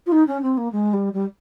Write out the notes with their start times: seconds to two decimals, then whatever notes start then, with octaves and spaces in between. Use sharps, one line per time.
0.06 F4
0.12 D#4
0.27 C#4
0.42 C4
0.58 A#3
0.72 G#3
0.93 G3
1.13 G3